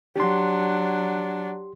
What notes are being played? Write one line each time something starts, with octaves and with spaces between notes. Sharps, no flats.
F#3 D4 G4 C6